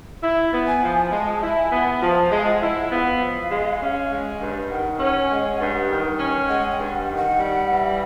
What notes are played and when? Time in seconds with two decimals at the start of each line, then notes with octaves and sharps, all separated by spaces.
0.23 E4
0.53 B3
0.67 G#5
0.83 F3
1.12 G#3 A5
1.43 E4
1.56 G#5
1.72 B3
2.02 F3 A5
2.31 G#3
2.37 F5
2.47 G5
2.51 F#5
2.62 E4
2.91 B3 F5
3.22 F3
3.50 G#3
3.81 C#4
4.11 G#3
4.41 G2
4.70 D#3 F#5
4.99 C#4
5.30 G#3
5.60 G2
5.90 D#3
6.19 C#4
6.49 G#3 F#5
6.72 G5
6.78 G2
6.93 F#5
7.09 D#3
7.16 F#5
7.39 G3
7.68 E3